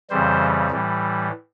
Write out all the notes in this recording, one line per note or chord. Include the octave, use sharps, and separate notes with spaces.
F2 C#3 E3 G3 C5
A2 E3 G3